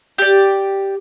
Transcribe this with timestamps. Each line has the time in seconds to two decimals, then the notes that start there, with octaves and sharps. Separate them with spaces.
0.18 G4 D5